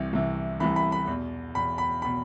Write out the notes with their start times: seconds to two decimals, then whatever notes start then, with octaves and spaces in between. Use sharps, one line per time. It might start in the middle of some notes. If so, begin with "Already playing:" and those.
Already playing: C2 C3 E3
0.13 C2 C3 E3
0.60 C2 C3 E3 B5
0.76 B5
0.92 B5
1.07 E2 B2
1.55 E2 B2 B5
1.78 B5
2.02 B5
2.05 B2